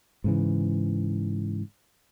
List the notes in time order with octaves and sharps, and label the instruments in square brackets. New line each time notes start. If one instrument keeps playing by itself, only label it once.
[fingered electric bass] G#2 C#3 E3